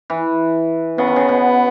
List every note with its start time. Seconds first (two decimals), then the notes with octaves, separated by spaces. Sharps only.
0.10 E3
0.98 C#3 B3
1.07 D#3
1.16 C#3
1.29 B2